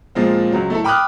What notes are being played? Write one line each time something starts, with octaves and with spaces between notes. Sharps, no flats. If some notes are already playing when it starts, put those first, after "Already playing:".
A#2 F3 G#3 C4
C#2 F#3
A3 E4 A4
G5 B5 D6 D#6 F6 F#6